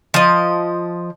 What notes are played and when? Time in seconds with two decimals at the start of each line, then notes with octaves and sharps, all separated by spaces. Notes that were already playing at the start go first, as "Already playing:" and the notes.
0.14 F3 D#5